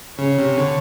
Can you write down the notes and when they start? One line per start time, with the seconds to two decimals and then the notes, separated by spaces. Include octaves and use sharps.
0.19 C#3 C#5
0.38 C3
0.58 D3